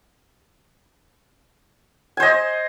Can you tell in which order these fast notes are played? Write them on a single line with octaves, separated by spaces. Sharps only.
G#5 C5 D#5